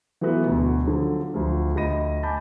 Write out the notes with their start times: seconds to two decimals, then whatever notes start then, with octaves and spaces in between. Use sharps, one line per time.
0.21 E3 F#3 A3 B3 F#4
0.44 D2 B2
0.85 D3 F3 F#3
1.34 D2 F3
1.75 D2 D#5 B5 A#6 D#7
2.23 G#5 A5 B5 D6 G6